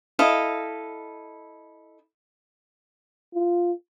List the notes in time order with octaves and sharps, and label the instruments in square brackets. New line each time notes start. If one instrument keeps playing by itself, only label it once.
[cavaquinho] E4 A4 D#5 F5
[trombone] F4